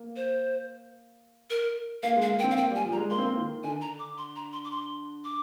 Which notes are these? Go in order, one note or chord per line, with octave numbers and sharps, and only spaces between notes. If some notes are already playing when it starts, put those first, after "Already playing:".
Already playing: A#3
C5
A#4
A#3 F5
G#3
F5
A#3
G5
C4
F5
A#3 G5
G3 G#5
F3
G3 A#5
G#3
A#3 C6
C4
A#3
D#3
D3 G#5
A#5
D6
C6
A#5
C6
D6
C6
D6